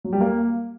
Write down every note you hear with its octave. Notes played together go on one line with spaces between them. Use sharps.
F#3
G3
A#3